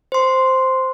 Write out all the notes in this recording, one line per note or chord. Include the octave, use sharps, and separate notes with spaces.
C5 C6